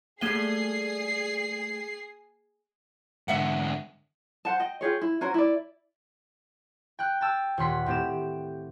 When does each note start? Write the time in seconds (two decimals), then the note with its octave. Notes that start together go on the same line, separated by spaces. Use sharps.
0.21 G3 A3 A#3 G#4 F5 C7 D#7 G7
3.28 G#2 D3 E5 F#5
4.45 C5 F#5 A5
4.60 D#5 G5
4.81 F4 G4 G#4 C#5
5.02 E4
5.21 C#4 F#4 A#4 C5
5.34 E4 D5
6.99 G5 F#6
7.21 G5 A5 E6
7.57 D#1 A#2 F#5 C6 B6
7.86 A2 C4 G4 E7